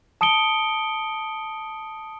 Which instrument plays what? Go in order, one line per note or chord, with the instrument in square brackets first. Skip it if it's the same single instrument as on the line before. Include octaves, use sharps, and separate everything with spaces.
[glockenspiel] A5 D#6 C#7 D7 G7